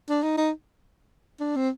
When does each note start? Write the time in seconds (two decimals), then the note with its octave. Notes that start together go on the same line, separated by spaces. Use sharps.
0.09 D4
0.23 D#4
0.37 D#4
1.40 D4
1.56 C4